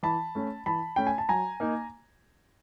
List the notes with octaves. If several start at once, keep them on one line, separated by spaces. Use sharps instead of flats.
E3 A5 B5
A3 C#4
E3 A5 B5
A3 C#4 G5
G#5
A5
F#3 G#5 A#5
A#3 D#4